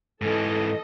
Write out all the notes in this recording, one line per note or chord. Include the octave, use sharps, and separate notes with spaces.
G#2 E3 A4 D#5